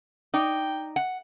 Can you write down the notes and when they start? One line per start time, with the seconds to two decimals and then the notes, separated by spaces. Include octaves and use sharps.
0.34 D#4 D5 G5
0.96 F#5